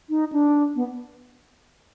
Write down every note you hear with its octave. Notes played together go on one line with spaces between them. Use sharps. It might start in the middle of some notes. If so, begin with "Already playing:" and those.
D#4
D4
B3